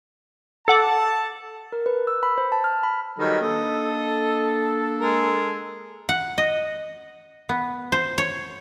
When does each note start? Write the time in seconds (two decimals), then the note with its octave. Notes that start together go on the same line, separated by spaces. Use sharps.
0.68 A4 F#5 A5 D6
1.72 A#4
1.86 B4
2.07 E6
2.23 B5
2.38 C5
2.52 A5
2.64 F6
2.83 B5
3.19 D#3 F#3 G3 A4 B4 D#5
3.42 A#3 D4 A4 D#5
5.01 G#3 A#4
6.09 F#5
6.38 D#5
7.49 B3
7.92 C5
8.18 C#5